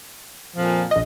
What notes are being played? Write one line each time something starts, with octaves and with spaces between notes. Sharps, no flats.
F2 A#2 F3
A#1 D#5